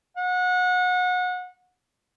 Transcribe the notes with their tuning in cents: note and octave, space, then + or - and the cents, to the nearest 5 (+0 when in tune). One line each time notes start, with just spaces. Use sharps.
F#5 -30